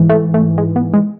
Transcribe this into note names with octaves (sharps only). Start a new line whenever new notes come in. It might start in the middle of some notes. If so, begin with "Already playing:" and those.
Already playing: G#2 E3
A3
A3
G#3
B3
G#3